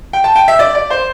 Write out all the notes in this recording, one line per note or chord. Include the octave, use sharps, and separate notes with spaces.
G5
A5
G5
E5
D5
D5
C5